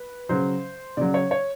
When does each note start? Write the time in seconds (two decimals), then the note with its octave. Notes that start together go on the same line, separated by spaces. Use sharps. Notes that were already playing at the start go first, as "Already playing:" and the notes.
Already playing: B4
0.29 C#3 F#3 C5
0.97 C#3 F#3 D5
1.14 C#5
1.31 C#5